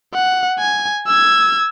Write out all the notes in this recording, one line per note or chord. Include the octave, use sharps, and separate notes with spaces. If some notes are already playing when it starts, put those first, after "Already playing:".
F#5
G#5
E6 G#6